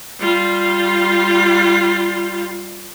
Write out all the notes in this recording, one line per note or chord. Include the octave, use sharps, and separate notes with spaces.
G3 F4